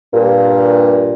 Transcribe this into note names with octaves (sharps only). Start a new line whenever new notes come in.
G2 A#2